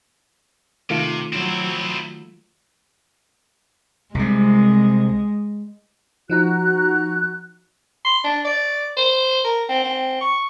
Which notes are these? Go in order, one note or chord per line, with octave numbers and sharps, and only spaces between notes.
C3 D#3 A3 F4
F#3 C4 E4
C2 C3 G#3
F3 D#4 F#4 A#5 F#6
C6
D4
D5
C5
A#4
C4
C4
C#6